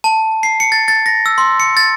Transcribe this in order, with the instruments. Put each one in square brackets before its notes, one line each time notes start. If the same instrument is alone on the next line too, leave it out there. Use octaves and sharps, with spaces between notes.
[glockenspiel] A5
C7
C#7
A6
A6
A#6
E6
C6
C#7
A6